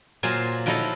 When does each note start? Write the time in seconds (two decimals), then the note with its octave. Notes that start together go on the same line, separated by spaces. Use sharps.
0.23 A#2 F#3 C5 F5 G#5 A5
0.66 F3 F#3 D#4 E4 A4 D#5